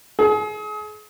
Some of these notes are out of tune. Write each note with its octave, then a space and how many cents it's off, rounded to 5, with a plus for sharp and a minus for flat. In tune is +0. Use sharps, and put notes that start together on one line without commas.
G#4 +35